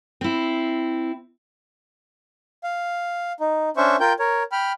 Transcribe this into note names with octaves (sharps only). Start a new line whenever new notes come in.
C4 E4
F5
D#4
C#4 D4 C5 E5 C#6
F4 A#4 G5 G6
A#4 C#5
G5 B5 F6